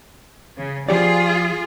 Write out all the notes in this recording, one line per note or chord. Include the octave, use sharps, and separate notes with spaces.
C#3
F3 F4 G4 G#4 D5